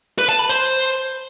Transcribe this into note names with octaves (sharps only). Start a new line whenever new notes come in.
B4
A5
B5
C5